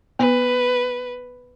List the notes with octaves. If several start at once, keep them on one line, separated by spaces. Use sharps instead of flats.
B3 B4